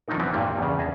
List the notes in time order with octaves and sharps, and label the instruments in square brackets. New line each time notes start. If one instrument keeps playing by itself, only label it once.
[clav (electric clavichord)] D#3 F3 F#3 D4 D#4 A#4
F#2 E3 B3 C4
G2 A#2 G3 A#3
E2 C#3
E2 G#4 D#5 E5 A5